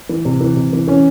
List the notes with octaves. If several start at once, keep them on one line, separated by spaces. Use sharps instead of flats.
E3
C3
E3
C3
E3
E3 C#4